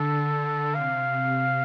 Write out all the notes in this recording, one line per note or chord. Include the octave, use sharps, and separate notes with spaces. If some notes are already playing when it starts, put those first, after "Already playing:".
Already playing: D3 A4
C3 F5